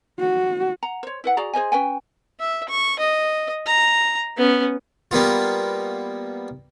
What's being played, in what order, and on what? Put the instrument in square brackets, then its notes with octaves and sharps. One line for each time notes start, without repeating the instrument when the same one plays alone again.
[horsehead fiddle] F#4
[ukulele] F#5 A#5
C5 C#5
E4 B4 F#5
F#4 G#4 D5 A#5
G#4 C5 D#5 G#5
C#4 B4 G5 G#5
[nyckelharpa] E5
C#6
D#5
A#5
B3 C#4
[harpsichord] G3 A#3 B3 F4